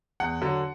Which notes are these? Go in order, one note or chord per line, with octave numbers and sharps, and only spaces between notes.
E2 F#5
D3 F#3